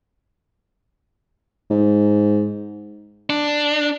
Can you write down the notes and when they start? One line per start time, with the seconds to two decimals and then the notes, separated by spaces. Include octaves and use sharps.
1.70 G#2
3.30 D4